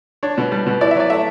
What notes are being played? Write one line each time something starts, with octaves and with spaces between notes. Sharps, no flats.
D4 C#5
B2
G3
B2
E4 D5
E5
F#3 D5
A3 E5